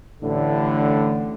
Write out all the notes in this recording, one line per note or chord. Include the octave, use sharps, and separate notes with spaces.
A1 A2 D3